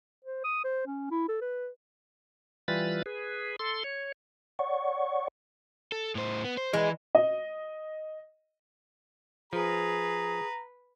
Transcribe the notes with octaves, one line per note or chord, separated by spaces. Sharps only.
C5
D#6
C5
C#4
E4
A4
B4
E3 G3 F4 B4 B5 A6
G#4 B4
A4 C6
C#5
C#5 D5 F#5 C#6
A4
A2 C5
B3
C5
E3 G#3 B4
D#5
F3 G#4 B4 A#5